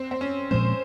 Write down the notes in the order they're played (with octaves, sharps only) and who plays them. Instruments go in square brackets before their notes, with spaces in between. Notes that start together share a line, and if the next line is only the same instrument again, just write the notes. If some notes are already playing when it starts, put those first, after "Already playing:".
Already playing: [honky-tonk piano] C4
C4
C#4
[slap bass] A#2 F3 G#3 C4 [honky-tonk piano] C5